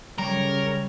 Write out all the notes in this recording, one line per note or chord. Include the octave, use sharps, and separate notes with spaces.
C#3 G3 A#4 C#5